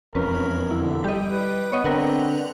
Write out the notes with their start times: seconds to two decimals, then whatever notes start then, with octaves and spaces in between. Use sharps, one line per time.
0.15 E1 F2 C#4 A#4 B4
0.71 D3 E4
1.04 G3 G4 D#5
1.28 B4
1.72 B3 C#5 D#5
1.84 D3 C4 A#4 B4 F#5